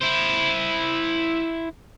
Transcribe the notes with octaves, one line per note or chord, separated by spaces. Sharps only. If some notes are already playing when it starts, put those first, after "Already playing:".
E4 C5